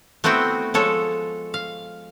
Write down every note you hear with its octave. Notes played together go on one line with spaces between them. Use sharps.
A3 B3 C4 E4 F#4 G5
F3 G#3 A4 C#5
F5